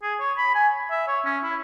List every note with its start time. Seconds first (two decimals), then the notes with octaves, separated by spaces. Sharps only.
0.02 G#4
0.20 C#5
0.37 B5
0.55 G#5
0.91 E5
1.08 C#5
1.25 C#4
1.43 E4